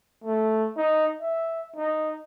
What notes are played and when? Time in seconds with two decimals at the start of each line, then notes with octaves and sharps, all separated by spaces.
0.24 A3
0.77 D#4
1.21 E5
1.76 D#4